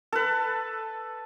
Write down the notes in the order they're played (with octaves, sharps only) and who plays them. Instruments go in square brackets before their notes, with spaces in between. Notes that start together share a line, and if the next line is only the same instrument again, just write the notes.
[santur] A4 B4